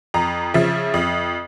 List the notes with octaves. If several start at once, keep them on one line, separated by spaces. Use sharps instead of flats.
F2 A#5
C#3 F3 E5
F2